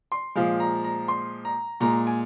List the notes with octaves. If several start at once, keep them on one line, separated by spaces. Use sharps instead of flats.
C6
A#2 F3 G#3 F5
A#5
A#5
C6
A#5
A#2 G#3 A#5
G#5